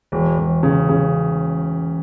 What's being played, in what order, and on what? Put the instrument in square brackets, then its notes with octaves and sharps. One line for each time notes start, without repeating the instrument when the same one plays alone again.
[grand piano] E1
E1
C#3
C#3